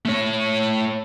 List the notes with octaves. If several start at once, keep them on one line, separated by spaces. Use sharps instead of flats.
A3 C#5